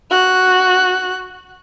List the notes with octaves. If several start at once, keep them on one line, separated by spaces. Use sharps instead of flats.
F#4 F#6